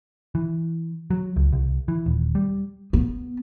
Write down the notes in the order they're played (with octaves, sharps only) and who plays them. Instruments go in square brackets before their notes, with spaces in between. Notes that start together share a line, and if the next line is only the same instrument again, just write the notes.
[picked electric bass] E3
F#3
C#2
C2
E3
D#1
G3
[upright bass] B3